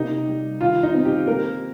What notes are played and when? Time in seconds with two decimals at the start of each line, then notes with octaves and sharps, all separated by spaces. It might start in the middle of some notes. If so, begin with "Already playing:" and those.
Already playing: C3 A#3 D#4
0.27 G3
0.61 D#3 F4
0.83 D#4
0.94 C4
1.05 G4
1.27 A#3 A#4